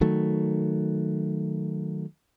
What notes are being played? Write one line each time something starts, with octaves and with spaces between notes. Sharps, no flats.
D#3 F#3 A3